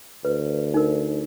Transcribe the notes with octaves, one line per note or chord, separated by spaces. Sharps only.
D2 B4
D#4 A#4